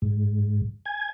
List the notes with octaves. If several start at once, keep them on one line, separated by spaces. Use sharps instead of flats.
G#2
G#5